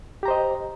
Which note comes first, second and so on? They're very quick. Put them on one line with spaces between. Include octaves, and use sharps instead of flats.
G4 A#5 C5 D#5